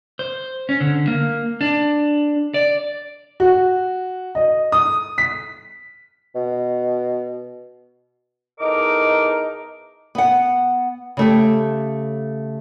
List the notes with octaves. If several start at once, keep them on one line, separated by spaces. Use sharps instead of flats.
C5
C#4
D3
A#3
D4
D5
F#4
D#5
D#6
B6
B2
E2 D#4 A4 A#4 D#5 D6
B3 F#5
C#3 A3 G4